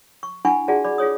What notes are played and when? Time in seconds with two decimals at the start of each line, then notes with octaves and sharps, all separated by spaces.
0.23 C#6
0.45 D4 E4 F#5 G#5 B5 C#6
0.68 F4 F#4 G#4 D5 F#5 A5
0.85 D5 B5 D6
0.98 F4 G#4 C#5 D#6